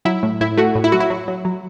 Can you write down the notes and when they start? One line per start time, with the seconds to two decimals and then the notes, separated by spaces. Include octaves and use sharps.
0.05 F#3 E4
0.23 A2
0.41 A2 E4
0.57 A3 F#4
0.75 A2
0.84 E4
0.92 F#3 F#4
1.00 E4
1.10 F#3
1.28 F#3
1.45 F#3